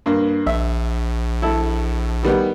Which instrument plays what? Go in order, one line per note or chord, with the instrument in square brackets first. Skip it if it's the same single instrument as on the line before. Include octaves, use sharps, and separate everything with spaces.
[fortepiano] G2 A#3
[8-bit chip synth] A#1 [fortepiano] E5
[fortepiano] E4 A4
D#3 G3 B3